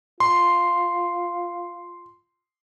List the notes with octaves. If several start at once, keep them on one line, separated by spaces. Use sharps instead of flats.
F4 C6